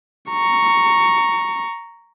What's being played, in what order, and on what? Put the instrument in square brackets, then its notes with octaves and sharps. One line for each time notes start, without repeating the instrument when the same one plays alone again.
[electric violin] A#5 C#6